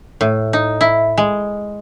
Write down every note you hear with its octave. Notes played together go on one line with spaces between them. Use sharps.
A2
D#4
E4
G#3